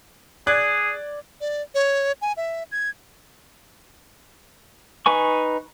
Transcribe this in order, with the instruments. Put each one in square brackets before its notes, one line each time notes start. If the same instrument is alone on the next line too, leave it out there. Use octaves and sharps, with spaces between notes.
[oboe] G#4 [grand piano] D5 F#6 G#6
[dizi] D5
C#5
G#5
E5
G#6
[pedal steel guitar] D#4 B4 G#5 C#6